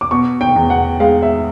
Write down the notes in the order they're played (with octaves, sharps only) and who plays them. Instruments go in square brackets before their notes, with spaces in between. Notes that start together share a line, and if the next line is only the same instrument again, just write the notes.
[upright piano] D6
B2 C#6
G5
E2
F#5
G#3 F5
E5